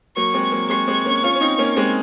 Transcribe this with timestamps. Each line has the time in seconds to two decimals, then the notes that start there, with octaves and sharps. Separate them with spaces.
0.17 F#3 A#3 C#6
0.34 G#3 C4
0.52 F#3 A#3
0.70 G#3 C4 C#6
0.88 G#3 C4
1.05 A#3 C#4
1.23 C#4 F4
1.35 C#4
1.41 C4 D#4
1.58 A#3 C#4
1.76 G#3 C4